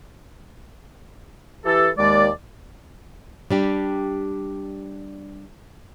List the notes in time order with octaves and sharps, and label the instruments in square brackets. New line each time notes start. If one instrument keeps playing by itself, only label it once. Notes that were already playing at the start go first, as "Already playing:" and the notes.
[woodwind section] E3 G4 A4
D#2 G#3 D5
[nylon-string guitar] G3 D4 G4